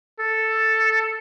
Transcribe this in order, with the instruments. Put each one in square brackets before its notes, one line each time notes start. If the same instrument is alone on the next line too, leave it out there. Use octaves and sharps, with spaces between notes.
[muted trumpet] A4